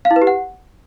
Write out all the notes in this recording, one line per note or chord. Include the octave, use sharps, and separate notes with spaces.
F5
E4
B4
G4
F#5